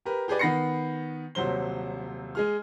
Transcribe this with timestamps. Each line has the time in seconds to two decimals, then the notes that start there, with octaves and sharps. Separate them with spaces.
0.06 G4 A#4 B4
0.28 G4 G#4 B4 D5
0.39 D#3 B3 B5 A#6 C7 C#7
1.35 D#1 C3 F#3 C5 G7
2.35 G#3 G#4 F6